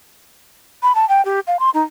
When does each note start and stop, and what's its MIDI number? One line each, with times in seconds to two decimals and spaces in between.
0.83 0.95 83
0.95 1.08 81
1.09 1.24 79
1.25 1.40 67
1.47 1.59 77
1.60 1.70 84
1.74 1.83 63